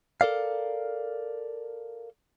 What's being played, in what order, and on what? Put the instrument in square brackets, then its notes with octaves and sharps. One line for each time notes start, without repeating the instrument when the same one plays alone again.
[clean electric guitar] A4 A#4 D5 F5